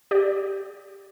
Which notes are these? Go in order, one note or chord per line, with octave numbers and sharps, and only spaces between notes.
G4 D5